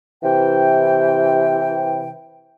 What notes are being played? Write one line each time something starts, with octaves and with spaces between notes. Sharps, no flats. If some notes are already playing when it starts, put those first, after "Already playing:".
C3 E3 G5